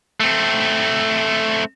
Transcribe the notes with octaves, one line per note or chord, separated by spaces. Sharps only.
A3 C4